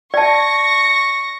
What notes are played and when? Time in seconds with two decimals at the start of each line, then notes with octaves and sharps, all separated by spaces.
0.14 D5 A5 C#6 A#6